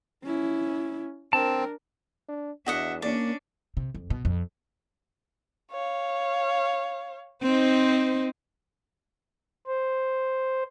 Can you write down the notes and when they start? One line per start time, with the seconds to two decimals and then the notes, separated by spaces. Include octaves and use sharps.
0.24 C#4 E4
1.33 C4 D4 A#4 A5
2.28 D4
2.66 E2 D4 F#4 D#5 E5 F#5
3.02 A#3 C#4 D4 D5
3.77 C3
3.95 F2
4.10 B2
4.25 F2
5.71 C#5 F5
7.42 C4 D#4 C5
9.67 C5